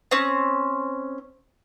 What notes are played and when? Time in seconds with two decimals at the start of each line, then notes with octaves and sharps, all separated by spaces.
0.11 C4 C#4